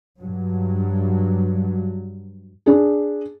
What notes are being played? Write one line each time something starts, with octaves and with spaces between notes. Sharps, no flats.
G2 F#3
D4 G#4